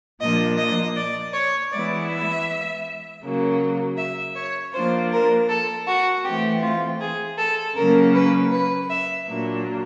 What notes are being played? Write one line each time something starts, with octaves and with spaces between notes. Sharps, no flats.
A#2 F3 A#3 D4 D#5
D#5
D5
C#5
E3 G#3 B3 E4 D5
E5
C#3 F#3 A#3
E5
C#5
F3 A#3 D4 F4 C5
A#4
A4
F#4
E3 A3 C4 G4
F4
G#4
A4
C#3 F#3 A#3 C#4 A#4
B4
B4
E5
A#2 F#3 A#3 D4